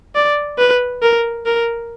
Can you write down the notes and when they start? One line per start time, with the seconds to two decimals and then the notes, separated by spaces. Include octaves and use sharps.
0.15 D5
0.59 B4
1.02 A#4
1.46 A#4